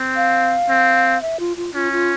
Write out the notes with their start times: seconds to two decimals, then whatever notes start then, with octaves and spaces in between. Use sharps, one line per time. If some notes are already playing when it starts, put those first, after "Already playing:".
Already playing: C4
0.16 F5
0.69 C4
1.22 E5
1.40 F4
1.57 F4
1.74 C#4 F4
1.92 F4